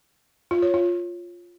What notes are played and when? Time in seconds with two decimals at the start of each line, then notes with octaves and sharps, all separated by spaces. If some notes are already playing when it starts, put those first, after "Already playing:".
0.51 F4
0.62 C#5
0.74 F4